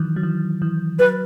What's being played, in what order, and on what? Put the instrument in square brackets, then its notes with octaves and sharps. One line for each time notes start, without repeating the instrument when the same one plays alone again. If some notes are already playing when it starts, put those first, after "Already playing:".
Already playing: [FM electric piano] D#3 E3 F#3
F#3
E3
E3
[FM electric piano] F#3 [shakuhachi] B4